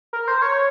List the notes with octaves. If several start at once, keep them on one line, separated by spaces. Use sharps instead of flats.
A#4
C5
C#5